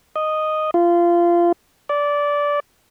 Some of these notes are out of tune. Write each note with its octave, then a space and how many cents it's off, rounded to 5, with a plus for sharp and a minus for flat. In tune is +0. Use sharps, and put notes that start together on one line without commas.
D#5 -5
F4 -20
D5 -15